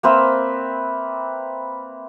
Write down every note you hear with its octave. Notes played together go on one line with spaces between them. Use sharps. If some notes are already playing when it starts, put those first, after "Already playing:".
A#3 C4 B4 E5